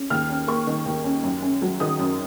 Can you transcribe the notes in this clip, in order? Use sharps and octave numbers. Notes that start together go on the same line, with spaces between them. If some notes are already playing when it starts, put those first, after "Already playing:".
Already playing: C#4
D#2 F6
C#4
A#3 C#6
D#3
D#2
C#4
F#2
C#4
F#3
D#3 D#6
F#2